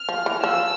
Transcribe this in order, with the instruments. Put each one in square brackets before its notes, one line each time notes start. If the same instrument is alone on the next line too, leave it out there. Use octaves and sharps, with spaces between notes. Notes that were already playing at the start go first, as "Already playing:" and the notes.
Already playing: [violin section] F6
[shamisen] F3
E3
[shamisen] F3 [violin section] E6